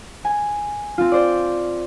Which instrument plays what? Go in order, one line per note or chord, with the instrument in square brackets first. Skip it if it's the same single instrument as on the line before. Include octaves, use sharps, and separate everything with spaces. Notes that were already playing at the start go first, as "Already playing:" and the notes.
[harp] G#5
C4 F4
C5 D5